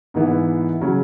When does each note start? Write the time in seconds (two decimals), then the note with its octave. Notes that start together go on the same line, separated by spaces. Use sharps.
0.14 G#2 E3 B3 E4
0.81 C#3 F#3